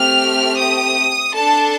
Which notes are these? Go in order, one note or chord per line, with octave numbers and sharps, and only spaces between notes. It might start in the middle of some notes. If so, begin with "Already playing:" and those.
Already playing: A3 C4 G4 F6
D#6
D4 A4 A5